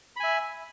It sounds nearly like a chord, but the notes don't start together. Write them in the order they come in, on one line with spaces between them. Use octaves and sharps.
B5 G#5 E5